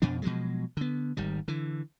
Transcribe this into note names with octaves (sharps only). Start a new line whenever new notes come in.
F2 B2 F3 D4
B2 F3 F#3 G#3
D3 B3
G#1 D#3 G3
D3 E3